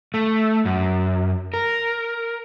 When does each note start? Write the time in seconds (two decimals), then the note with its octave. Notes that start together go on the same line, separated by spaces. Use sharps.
0.14 A3
0.65 F#2
1.54 A#4